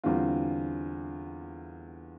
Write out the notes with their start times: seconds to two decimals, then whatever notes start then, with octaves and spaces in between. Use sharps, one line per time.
0.04 E2 D3 G3 C4 F4